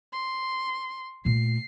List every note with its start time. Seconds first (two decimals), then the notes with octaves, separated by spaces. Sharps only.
0.12 C6
1.25 A#2 A3 C7